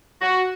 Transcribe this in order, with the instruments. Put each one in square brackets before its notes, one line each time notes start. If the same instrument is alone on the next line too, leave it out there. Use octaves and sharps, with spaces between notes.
[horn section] F#4